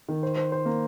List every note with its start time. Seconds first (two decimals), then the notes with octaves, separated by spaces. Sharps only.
0.09 D#3
0.23 C5
0.37 C5
0.52 C5
0.65 A#3